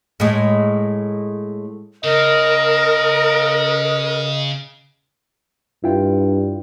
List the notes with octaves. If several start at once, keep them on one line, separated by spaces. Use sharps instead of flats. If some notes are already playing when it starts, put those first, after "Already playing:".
A2 G#3
C#3 A#4 D#5
G2 E4 F4 G5